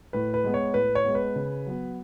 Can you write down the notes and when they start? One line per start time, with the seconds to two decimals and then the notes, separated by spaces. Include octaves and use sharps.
0.13 A2 B4
0.34 B4
0.44 G#3 B3
0.54 C#5
0.74 A2 B4
0.95 C#5
1.05 G#3 B3
1.15 B4
1.36 C#3
1.66 F#3 B3